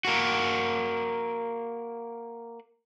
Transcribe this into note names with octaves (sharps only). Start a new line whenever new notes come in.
A#3 F#4